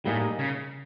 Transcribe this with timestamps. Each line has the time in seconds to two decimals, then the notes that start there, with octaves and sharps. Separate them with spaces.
0.05 A2 G3 A#3 D#4 G#4
0.39 C#3